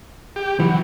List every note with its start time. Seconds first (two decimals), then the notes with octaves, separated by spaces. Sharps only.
0.36 G4
0.60 E3 F#3